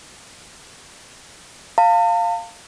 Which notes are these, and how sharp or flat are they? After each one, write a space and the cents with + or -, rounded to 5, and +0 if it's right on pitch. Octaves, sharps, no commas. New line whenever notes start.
F5 +0 A5 +45